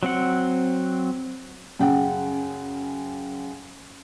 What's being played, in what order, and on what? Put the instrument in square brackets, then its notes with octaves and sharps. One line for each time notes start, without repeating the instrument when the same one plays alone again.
[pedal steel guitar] F#3 C4 F#5
[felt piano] F#2 C#3 F#5 G5